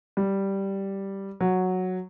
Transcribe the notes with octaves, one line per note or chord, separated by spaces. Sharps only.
G3
F#3